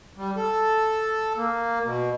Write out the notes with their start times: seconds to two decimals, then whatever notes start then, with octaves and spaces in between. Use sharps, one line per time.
0.17 G3
0.37 A4
1.37 A#3
1.84 B2